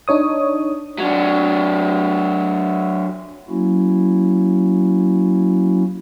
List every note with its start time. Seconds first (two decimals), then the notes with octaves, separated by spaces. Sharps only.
0.08 D4 D#4 C#5 D#6
0.98 F#3 D4
3.49 F#3 A#3 C#4 E4 F#4